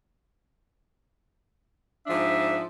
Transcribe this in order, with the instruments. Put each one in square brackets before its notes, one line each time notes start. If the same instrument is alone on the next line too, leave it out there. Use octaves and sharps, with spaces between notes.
[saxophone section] G#2 F3 D4 [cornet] E5